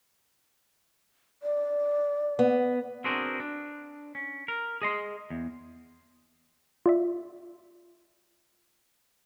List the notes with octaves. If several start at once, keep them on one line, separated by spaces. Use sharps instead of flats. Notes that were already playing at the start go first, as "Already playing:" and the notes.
D5
B3
C4 D4 F#4 G#4 A#4 C5
D4
C#4
A#4
G#4 D#5 C6
E2
F4 D5 E5